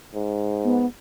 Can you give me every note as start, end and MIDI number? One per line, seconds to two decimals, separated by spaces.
0.15 0.88 44
0.64 0.86 59